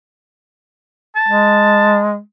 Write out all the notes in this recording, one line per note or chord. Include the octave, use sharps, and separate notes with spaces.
A5
G#3